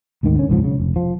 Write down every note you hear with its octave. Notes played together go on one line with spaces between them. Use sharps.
D2 G#2 D3 D#3
D3 C#4
E1 C#2 G#2 F3
C#3
F1
F3